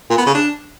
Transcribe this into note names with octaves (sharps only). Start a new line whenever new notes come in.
A#2
B3
C#3
D4